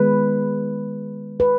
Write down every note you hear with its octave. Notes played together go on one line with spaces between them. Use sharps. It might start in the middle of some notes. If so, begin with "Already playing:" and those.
Already playing: D#3 G#3 B3 B4
B4